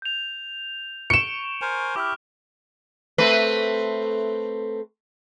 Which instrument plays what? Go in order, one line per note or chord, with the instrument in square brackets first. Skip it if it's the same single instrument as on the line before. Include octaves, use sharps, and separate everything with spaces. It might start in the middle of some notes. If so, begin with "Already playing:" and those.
[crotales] G6 F7
[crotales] C#6 D7 G7 [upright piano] C#7 E7
[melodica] A#4 C5 G#5
[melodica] E4 G4 [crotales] D6 F6
[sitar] A3 C4 B4